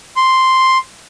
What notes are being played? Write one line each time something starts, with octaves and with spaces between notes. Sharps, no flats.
C6